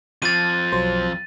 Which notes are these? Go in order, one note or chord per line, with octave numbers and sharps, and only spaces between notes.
F2 F3 A6 D#7
B1 F#3 C5